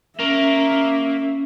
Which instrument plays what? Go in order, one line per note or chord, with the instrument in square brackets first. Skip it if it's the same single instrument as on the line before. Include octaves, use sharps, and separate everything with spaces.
[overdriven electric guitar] A#3 [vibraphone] C#4 [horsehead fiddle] E5